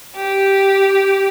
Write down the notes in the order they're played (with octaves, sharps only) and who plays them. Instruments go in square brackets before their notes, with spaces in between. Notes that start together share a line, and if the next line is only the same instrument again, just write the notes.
[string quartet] G4